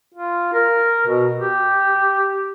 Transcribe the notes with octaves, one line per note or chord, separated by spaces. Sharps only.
F4
A#4
B2
G4